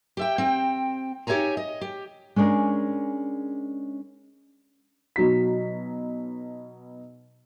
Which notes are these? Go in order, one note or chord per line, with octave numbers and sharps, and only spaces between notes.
G4 E5 G5
C4 G5
D#4 G4 C#5 E5 G#5 A#5
D#5
G4
G#3 C#4 D4 G#4 A#4
B2 F#3 D#4 B6